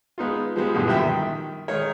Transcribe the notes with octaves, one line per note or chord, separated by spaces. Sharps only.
G#3 B3 D#4 F4
F3 G3 G#3 B3
G2 B2 D3 E3 G3
A#1 F#2 G3 E5 G5
D#3
D#3 G#3 D#4 A#4 C#5